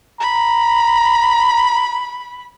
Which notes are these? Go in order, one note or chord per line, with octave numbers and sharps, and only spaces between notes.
A#5 B5